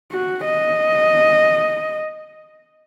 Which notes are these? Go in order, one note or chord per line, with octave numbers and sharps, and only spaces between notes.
F#4
D#5